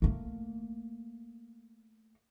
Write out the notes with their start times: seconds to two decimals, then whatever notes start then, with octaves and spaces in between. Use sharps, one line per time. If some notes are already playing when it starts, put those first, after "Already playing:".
0.02 A3 A#3